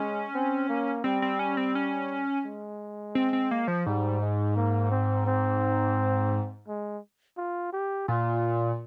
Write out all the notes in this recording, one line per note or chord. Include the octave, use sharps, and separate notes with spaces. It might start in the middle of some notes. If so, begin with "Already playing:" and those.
Already playing: G#3 C#4
C4
A#3
G3 C4
C4
C#4
C4
C#4
G#3
C4
C4
A#3
F3
G#2 G3
G#3
A#3
C4
C4
G#3
F4
G4
A#2 F4